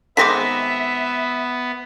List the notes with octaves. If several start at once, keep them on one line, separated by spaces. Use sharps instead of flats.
D#3 G#3 B3 C4 E5 D6 A#6 B6